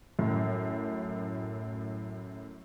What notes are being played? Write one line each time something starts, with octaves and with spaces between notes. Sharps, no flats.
F#2 A2